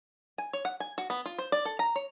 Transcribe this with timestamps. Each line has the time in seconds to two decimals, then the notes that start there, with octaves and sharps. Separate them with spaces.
0.38 G#5
0.53 C#5
0.65 F#5
0.80 G#5
0.98 F#4
1.10 B3
1.26 F4
1.38 C5
1.52 D5
1.65 A4
1.79 A#5
1.96 C#5